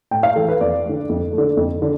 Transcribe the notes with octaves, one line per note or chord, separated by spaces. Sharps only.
A2 G5
F5
E3 A3 A4
B4
F2 D5
D3 A3
F2
A3
D3
F2
D3